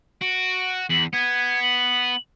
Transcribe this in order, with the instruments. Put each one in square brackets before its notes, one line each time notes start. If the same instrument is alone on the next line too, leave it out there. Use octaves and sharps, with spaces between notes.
[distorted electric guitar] F#4 [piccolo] D7
[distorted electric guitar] E2 [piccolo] F#7
[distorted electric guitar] B3 [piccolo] G#6
[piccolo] F#7